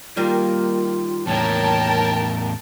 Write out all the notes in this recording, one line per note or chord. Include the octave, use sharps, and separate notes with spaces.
D#3 G3 A#3 F4
E2 A2 A#4 C#5 G5 A5